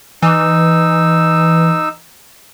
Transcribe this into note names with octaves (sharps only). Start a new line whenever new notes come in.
E3 D#4 E6